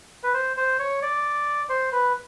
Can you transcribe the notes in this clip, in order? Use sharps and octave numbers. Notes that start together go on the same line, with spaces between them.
B4
C5
C5
C#5
D5
C5
B4